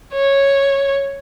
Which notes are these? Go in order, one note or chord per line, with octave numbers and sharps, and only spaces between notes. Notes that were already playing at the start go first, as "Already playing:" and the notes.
C#5